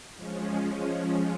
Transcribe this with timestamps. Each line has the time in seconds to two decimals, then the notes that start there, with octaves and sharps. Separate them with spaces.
0.17 F3 G#3 C#4